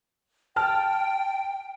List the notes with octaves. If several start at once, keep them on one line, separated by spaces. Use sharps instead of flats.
G5 A5 F6